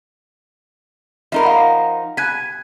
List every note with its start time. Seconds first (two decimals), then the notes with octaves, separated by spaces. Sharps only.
1.32 F3 D#4 A#4 E5 B5
1.43 F5 F#5 A#5
2.17 G#5 F#6 G#6 B6